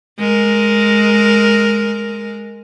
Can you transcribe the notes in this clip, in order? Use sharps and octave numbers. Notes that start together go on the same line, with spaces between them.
G#3 A#4